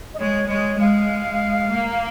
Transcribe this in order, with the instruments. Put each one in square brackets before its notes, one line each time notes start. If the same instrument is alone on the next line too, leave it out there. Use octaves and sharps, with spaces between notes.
[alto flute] D#5
[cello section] G#3 [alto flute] C#5
[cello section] G#3 [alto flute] C#5
[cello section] G#3 [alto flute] F5
[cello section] A#3